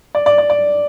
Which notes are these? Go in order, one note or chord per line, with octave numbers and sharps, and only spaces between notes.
D5
D5
D5
D5